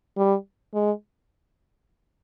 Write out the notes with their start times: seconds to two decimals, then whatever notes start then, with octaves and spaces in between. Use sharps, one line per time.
0.17 G3
0.74 G#3